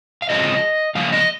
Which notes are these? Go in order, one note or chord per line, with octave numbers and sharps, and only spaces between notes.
F5
C#3 F3 G#3 C4 D#5
C#3 F3 A#3 F5
D#5